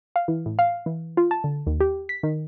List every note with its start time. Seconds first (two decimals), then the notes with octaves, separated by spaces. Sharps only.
0.16 F5
0.28 E3
0.46 A2
0.59 F5
0.86 E3
1.17 F4
1.31 A5
1.44 D3
1.67 D#2
1.80 G4
2.09 B6
2.23 D#3